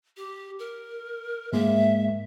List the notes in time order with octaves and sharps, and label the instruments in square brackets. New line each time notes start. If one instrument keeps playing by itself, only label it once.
[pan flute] G4
A#4
[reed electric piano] G#2 G#3 A#3 [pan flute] E5